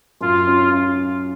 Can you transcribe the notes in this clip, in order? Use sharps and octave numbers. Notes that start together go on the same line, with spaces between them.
F#2 F4
C#4
C#4